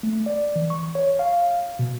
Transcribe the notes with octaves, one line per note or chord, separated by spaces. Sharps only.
A3
D5
E3
C#6
C#5
F5
B2